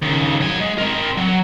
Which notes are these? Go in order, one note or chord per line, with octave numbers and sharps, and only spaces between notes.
D#2 C#3
F#3 G#5
G#3
C4 A#4
F#3